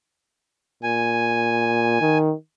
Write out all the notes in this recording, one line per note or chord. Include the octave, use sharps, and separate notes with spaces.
A#2 G#5
D#3